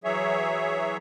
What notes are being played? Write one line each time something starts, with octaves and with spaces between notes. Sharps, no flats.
E3 F#3 G#4 C#5 E5